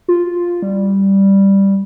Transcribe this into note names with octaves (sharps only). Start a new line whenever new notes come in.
F4
G3